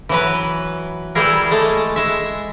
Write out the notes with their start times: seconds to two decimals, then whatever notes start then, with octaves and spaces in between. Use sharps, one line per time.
0.09 E3 F#3 B4
1.15 E3 G3 E4 G#4 A#4
1.51 G#3 A3 A5
1.96 G#3 E5